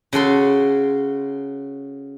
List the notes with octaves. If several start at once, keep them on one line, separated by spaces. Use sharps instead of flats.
C#3 F#4 A4 C6